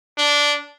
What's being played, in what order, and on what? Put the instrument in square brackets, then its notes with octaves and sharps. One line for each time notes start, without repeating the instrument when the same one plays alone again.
[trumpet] D4